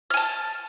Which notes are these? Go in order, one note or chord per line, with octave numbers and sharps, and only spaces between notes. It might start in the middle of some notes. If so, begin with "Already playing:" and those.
G#5 A5 F6